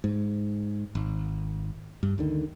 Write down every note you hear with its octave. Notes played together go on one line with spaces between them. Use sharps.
G#2
G#1
G2
D2 D3 D#3